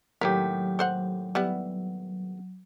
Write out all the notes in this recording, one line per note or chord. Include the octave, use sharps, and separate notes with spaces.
D#2 A2 F#3 G4 A#4
A4 C5 F#5
G3 B3 E4